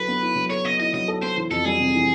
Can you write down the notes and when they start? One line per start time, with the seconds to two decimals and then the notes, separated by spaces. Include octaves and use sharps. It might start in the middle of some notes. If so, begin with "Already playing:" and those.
Already playing: F#3 E4 A4 B4
0.08 B3
0.22 E4
0.36 F#3
0.50 A4 C#5
0.65 B3 D#5
0.80 E4 D#5
0.93 F#3 D#5
1.08 A4
1.22 B3 C5
1.37 E3
1.51 F2 A4
1.65 G3 G#4
1.80 C3
1.94 E3